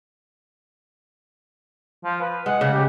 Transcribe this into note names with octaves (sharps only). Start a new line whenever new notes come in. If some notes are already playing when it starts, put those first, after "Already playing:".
F3
B4
G#3 F#5
C#3
G4